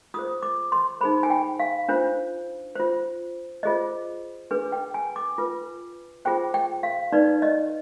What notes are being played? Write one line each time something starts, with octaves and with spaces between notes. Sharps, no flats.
F4 G#4 C5 D#6
D6
C6
D#4 G#4 C5 B5
G#5
G5
F5
D4 F4 C5
F4 C5
F4 G#4 C5 D#5
D4 G#4 B4
G5
G#5
D6
F4 B4
F4 G#4 C5 G5
G5
F5
D#4 B4 D5
D#5